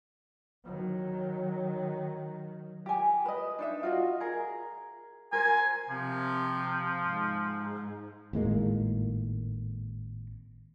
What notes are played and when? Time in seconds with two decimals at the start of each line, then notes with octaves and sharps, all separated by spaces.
0.64 D#3 F#3
2.86 G4 G#5
3.25 B4 D#5
3.59 D4 D#4 E5
3.83 F4 F#4 D#5
4.20 G#4 A#4
5.33 A#4 C5 G#5
5.90 C3 F3
7.05 G#2
8.33 G#1 A2 G#3 A#3